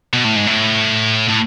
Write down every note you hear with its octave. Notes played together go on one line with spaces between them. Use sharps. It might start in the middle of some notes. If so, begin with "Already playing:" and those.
B2
A2
G#2
A2
A2